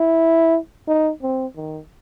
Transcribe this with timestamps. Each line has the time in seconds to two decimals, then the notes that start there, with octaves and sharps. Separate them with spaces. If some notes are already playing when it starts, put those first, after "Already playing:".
Already playing: E4
0.88 D#4
1.22 C4
1.56 D#3